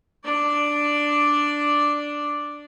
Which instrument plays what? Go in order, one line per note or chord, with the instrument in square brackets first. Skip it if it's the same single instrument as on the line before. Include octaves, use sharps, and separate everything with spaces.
[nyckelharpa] D4 D5